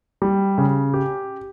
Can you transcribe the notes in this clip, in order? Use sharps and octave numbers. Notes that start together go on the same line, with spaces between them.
G3
C#3
G4